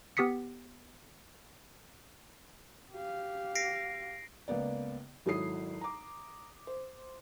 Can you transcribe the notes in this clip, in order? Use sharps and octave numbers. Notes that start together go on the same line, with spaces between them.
B3 G4 D#6 B6 C#7
G4 F5
A#6 C7 D7
C#2 A#3 B3 D5
G#1 F#3 E4 A4 D#6 C7
A#5 D6
C5